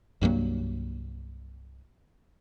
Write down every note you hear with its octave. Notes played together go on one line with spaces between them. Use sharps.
C2 G2 F#3 A#3